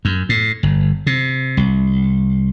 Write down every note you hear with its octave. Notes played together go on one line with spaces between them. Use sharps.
F#2
A2
G1
C3
C2